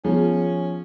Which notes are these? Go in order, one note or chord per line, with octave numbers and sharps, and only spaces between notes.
F3 B3 C#4 G#4